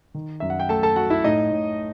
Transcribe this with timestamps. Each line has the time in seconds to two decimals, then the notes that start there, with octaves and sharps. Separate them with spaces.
0.14 D#3
0.40 F#2 E5
0.50 F#5
0.60 G5
0.69 A3 A4 A5
0.83 A4 A5
0.96 A3 F#4 F#5
1.10 E4 E5
1.24 A2 D#4 D#5
1.51 A2